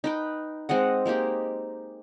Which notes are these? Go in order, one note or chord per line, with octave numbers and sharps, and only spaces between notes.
D#4 B4 G5
G#3 C4 D#5 F#5
G#3 A#3 D#4 G4